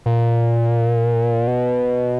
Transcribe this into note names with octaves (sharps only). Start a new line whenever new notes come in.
A#2
B2